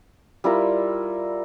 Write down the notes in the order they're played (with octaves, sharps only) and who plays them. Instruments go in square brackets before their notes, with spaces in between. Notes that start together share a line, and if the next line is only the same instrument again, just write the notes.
[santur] G3 E4 F4 A#4